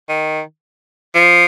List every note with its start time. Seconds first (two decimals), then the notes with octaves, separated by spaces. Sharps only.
0.09 D#3
1.15 F3